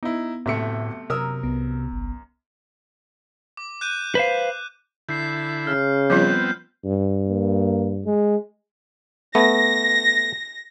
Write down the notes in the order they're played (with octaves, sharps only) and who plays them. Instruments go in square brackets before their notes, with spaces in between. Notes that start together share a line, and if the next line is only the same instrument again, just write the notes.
[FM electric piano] B3 [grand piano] D#4 E4
[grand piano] D1 E5 C#7 [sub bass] A2 [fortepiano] C3 A3
[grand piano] F#2 [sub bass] C3 [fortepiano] A#4 D#6 E6
[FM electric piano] C2 B3
[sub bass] G1
[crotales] D6
F#6 G6 D#7
[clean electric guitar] B4 C5 F5
[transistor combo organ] D3 E4 [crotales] G6 C7
[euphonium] C#3 [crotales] F6
[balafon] F3 G3 F4 [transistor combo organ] B3 C4 [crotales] G6
[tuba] G2
[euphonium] A#3
G#3
[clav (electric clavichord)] A3 B3 [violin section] A#6